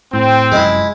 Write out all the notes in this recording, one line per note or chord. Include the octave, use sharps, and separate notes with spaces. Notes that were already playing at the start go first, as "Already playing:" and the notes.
A2 C4
F1 F#2 G#3 E4